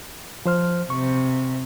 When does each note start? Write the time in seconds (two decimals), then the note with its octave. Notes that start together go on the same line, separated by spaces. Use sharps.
0.45 F3 C5 F6
0.90 C3 C#6